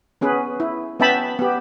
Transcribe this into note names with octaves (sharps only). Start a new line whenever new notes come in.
B3 C#4 G#4 B4
E4
B3 C#4 E5 G5 A5 B5
B3 G4